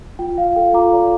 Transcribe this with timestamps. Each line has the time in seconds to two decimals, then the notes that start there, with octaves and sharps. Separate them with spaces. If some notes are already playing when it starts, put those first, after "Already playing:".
0.19 F4 G5
0.38 F4 F5
0.56 A4 G5
0.74 F4 A#5 D6
0.93 D5